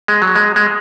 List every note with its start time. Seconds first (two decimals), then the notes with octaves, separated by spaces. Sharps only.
0.08 G#3
0.22 F#3
0.36 G#3
0.56 G#3